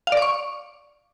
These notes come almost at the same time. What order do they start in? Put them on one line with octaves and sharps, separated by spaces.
F5 D5 D6 C#6